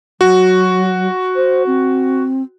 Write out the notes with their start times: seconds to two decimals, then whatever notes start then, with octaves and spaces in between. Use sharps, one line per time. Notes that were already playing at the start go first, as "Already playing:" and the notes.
0.21 F#3 F#4
1.36 C5
1.67 C4